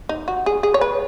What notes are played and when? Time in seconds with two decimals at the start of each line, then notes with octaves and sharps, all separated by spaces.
0.09 D#4
0.28 F#4
0.46 G#4
0.63 G#4
0.74 C#5
0.81 B4